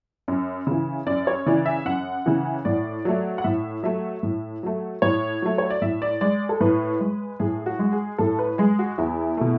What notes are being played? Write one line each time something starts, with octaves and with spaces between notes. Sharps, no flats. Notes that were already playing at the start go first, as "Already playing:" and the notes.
F#2
C#3 E3
F#2 D5
C#5
C#3 E3 D5
E5
F#2 F#5
C#3 E3
A2 D5
F#3 A3
F#5
A2 E5
F#3 A3 E5
A2
F#3 A3
A2 C#5
F#3 A3
C#5
D5
A2 E5
D5
G#3 D5
A4
A2 B4
G#3
A2 G#4
F#4
G#3
G#4
A2 A4
B4
G#3 G#4
F#4
E2 E4
B2 A3